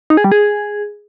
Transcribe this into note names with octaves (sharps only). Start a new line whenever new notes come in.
D#4
G#4
G3
G#4